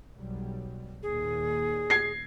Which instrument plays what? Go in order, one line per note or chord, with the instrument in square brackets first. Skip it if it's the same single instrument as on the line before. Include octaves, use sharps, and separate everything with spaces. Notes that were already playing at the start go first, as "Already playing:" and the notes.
[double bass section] B1 F#3 G3
[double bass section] D#2 A#2 [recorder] G#4
[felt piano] G#6 C7